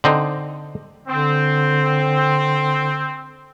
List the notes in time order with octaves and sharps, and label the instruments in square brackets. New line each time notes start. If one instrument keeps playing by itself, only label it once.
[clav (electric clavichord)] D3 C4 D#4
[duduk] D3 [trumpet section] C4